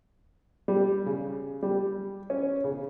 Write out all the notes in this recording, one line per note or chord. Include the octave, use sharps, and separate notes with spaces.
G3
C#3
G3
C#4
C#3